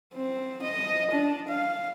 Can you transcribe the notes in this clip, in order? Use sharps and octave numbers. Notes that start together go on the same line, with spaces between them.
C4
D#5
D4
F5